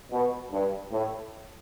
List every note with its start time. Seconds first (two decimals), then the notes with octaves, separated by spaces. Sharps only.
0.11 B2
0.52 G2
0.92 A2